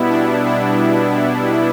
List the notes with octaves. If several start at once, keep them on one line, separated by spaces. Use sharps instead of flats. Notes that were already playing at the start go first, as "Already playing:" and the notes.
Already playing: B2 G3 B3 E4
D4
D4